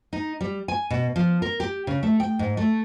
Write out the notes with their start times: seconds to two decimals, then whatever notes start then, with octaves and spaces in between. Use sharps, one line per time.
0.13 D#4
0.41 G3
0.68 G#5
0.90 B2
1.16 F3
1.42 A#4
1.60 G4
1.87 C#3
2.03 A3
2.20 G5
2.39 G#2
2.57 A3